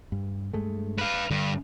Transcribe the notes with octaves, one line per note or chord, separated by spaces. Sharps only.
G2
G2 G#3 A3
B4 F5
G2 D3